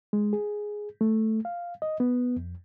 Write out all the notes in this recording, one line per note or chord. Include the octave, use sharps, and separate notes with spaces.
G#3
G#4
A3
F5
D#5
B3
F2